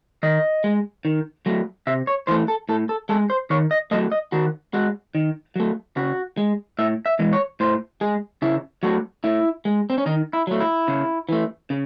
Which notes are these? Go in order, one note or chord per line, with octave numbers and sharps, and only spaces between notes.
D#3 D#5
G#3
D#3
F#3 A3
C3 E5
C#5
E3 A3 C5
A4
A2 A4
A4
G#3 A4
C5
D#3 C#5
D#5
F#3 A3 D#5
D#5
D#3 F#4
G#3 F#4
D#3
F#3 A3
C#3 F#4
G#3
A2 E5
E5
E3 G#3
C#5
A2 C5
G#3 G#4
C#3 E4
F#3 A3 F#4
A2 E4
G#3
C4
C#4
D#3 D#4
E4
F#3 A3
E4
C#3
E3 A3
C#3